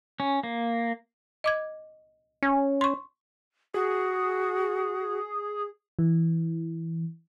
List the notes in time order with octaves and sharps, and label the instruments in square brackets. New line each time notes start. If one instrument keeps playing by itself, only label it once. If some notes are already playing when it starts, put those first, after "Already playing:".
[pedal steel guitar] C#4
A#3
[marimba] D#5 D6 G#6
[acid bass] C#4
[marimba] C6 C#6
[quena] F#4 [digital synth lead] G#4
[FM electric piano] E3